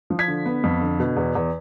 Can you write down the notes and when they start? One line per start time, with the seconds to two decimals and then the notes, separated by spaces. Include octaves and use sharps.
0.10 F3
0.19 G#6 B6
0.28 D3
0.46 B3
0.64 F2
0.81 D3
1.00 B2
1.16 E2
1.35 E2